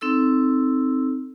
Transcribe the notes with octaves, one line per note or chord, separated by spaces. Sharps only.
C4 D#4 A4 E6